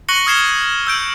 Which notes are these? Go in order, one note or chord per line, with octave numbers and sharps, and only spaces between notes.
C#6 F#6 A#6 C#7 F#7 G7
D#6 F6 G#6 C7 E7 G7
E6 G6 D7